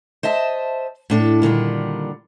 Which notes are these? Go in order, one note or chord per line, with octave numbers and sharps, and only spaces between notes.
C5 D#5 E5 A5
A2 D4 A4
A#2 D3 D#3 G3